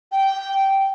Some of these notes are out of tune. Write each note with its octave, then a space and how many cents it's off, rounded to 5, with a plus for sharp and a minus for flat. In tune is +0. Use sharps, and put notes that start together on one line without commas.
G5 -10